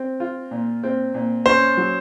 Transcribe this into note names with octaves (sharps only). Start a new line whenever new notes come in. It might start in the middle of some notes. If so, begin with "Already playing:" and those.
Already playing: C4
F4
A#2
C4
A#2
C#4 C5
F#3